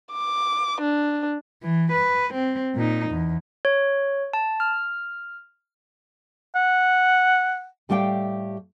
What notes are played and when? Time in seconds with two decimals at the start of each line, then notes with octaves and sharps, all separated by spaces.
0.12 D6
0.81 D4
1.63 E3
1.92 B4
2.34 C4
2.75 A#2 D#4
3.10 E2
3.65 C#5
4.33 A5
4.60 F6
6.55 F#5
7.89 A2 G3 A3 G4 F5 G5